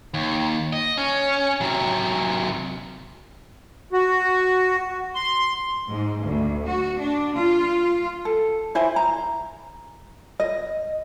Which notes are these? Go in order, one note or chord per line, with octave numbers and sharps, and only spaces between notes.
D#2
D#5
C#4
C3 F#3
F#4
C6
G#2
D2
F#4
D4
F4
A4
E4 C5 G#5
A#5
D#5